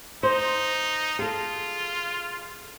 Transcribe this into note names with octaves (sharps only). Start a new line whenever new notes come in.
D#4 C5
F4 G#4 A4